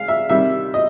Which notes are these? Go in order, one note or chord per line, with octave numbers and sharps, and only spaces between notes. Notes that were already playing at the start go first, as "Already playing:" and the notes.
Already playing: G#3 F5
E5
C3 D#3 G3 E5
D#5